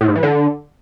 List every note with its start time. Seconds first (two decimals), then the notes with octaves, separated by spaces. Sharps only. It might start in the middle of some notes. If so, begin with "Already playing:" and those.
0.01 A2
0.08 G#2
0.15 E3
0.23 D3